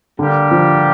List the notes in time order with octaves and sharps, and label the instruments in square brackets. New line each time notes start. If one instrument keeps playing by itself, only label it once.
[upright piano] D3 [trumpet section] G3 A#3 D4 G4
[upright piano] F3